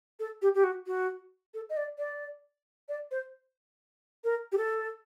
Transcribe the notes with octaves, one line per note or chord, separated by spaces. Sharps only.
A4
G4
G4
F#4
F#4
A4
D#5
D5
D5
D5
C5
A#4
G4
A4